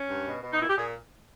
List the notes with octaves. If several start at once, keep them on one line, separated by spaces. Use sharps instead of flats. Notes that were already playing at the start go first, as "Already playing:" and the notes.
Already playing: C#4
G2
B2
B2
D#4
A#2 E4
G4
A#2 G#4